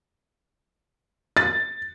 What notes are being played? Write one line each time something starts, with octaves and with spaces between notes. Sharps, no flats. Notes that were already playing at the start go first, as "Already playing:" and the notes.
A6